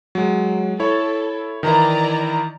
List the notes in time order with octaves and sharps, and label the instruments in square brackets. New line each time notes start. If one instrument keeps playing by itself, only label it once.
[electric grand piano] F#3 G#3
[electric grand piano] E4 C#5 [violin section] A4
[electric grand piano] D#3 E3 E4 [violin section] D5 D#5 A#5